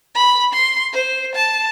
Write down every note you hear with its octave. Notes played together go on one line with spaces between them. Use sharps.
B5
C6
C5
A5